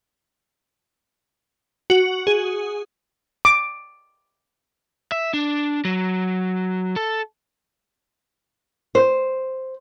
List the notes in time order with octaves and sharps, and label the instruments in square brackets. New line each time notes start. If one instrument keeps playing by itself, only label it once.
[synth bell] F#4
G#4
[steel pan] D6
[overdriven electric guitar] E5
D4
F#3
A4
[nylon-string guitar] C5